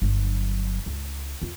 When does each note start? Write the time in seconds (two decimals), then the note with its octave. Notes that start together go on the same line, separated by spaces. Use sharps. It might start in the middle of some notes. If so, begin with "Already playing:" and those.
0.02 G1 F#3
0.86 C#2
1.42 E2 F4